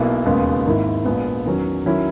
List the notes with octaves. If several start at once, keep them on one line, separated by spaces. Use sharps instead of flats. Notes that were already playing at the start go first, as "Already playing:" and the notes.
Already playing: B1 B2 A#3 E4
E1 D#2 C#3 G#3 B3
G#1 G#2 D#3 A#3 E4
A#1 A#2 G#3 B3
E2 D#3 F#3 C#4
D#3 F#3 C#4 E4